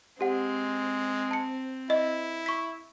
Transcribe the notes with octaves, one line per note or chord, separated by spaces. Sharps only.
G#3 C4 G4 F#5
A5 C#7
E4 D#5
C#6 B6